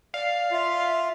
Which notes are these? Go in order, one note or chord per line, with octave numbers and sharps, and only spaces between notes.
D5 F5
F4 E5